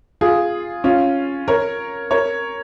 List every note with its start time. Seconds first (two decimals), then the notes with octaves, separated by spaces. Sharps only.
0.21 F4 G#4
0.84 C#4 F4
1.48 A#4 C#5
2.11 A#4 C#5